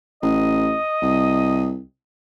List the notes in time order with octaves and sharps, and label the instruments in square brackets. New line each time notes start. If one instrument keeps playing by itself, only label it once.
[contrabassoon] A1 [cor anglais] D#5
[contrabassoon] C2